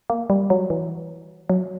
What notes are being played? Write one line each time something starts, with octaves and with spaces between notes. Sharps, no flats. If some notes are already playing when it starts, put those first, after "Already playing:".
A#3
G3
F#3
E3
F#3